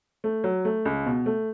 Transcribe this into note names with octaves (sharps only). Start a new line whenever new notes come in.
A3
F#3
A3
C#2
B2
A3